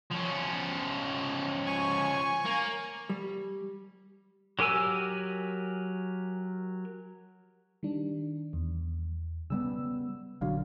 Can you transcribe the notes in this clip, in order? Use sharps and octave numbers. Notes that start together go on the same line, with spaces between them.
F3 C#4
G#5 C#6
A#3
G3
F#3 G4 A#4 G#5 E6
D#3 G3 D4
E2
C#3 G3 B3 E6
A#1 D3 F#3 F5